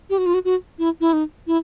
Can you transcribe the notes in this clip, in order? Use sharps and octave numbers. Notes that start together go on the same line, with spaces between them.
G4
F#4
F4
F#4
F#4
E4
E4
D#4
E4